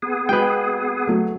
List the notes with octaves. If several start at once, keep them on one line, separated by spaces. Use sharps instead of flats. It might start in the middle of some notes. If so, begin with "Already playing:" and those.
B3 G#4
G#3 F#4 B4 G5
F#3 A3